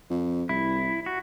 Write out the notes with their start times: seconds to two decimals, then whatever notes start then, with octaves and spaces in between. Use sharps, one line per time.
0.10 F2
0.49 C2 E4
1.06 F#4